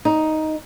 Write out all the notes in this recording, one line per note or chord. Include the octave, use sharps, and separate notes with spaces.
D#4